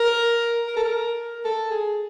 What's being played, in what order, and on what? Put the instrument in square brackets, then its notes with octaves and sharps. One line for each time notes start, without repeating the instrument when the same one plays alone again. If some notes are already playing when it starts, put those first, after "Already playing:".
Already playing: [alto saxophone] A#4
A#4
A4
A#4
A4
G#4